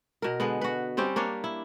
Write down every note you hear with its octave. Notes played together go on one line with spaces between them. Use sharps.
B2 A#4
D3 G#3 B3
F#4 B4
G3 C4 C#4 G4
A#3 D4 C#5
E4